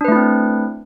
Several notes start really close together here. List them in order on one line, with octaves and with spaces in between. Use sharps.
D4 B4 A3 E4 C4